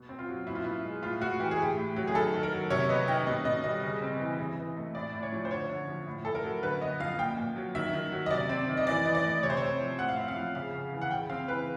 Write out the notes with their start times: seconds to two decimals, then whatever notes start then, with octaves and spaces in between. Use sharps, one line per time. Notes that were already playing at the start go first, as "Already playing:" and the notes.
Already playing: B2
0.09 C4
0.19 F4
0.28 F#3
0.46 B2 E4
0.55 F4
0.64 B2 E4
0.84 G#3
1.03 A2 F4
1.21 A2 F#4
1.40 E3 G4
1.51 G#4
1.58 A2 G4
1.78 A2
1.96 F#3
2.07 G#4
2.15 D#3 A4
2.34 D#3
2.43 A#4
2.52 F#3
2.70 C3 C#5
2.89 B3 D#5
3.08 D#3 G5
3.27 B2 D#5
3.45 B2 D#5
3.64 G3 D#5
3.83 C#3
4.02 C4
4.20 E3
4.38 E3
4.58 E3
4.77 A3
4.95 A2 D5
5.13 A2
5.23 C#5
5.32 F3
5.45 C5
5.51 D3 C#5
5.70 D3
5.88 F3
6.07 A2
6.25 A2 A4
6.35 A#4
6.44 F#3
6.63 D3 B4
6.81 B3 D#5
7.00 F3 F5
7.18 A#2 G5
7.37 A#2
7.56 F#3
7.75 D#3 E5
7.93 D#3
8.12 F#3
8.26 D#5
8.30 C3 D5
8.49 C4
8.68 D#3
8.77 D#5
8.87 E3 D5
9.05 E3 D#5
9.15 D5
9.24 A3
9.43 C3 C#5
9.50 C5
9.57 C4 C#5
9.80 F3
9.99 A2 F#5
10.09 F5
10.17 C4 E5
10.28 F5
10.36 F3
10.55 C#3 F5
10.74 C#3
10.93 E3
11.02 F#5
11.11 C#3 G5
11.30 C4 F5
11.48 E3 B4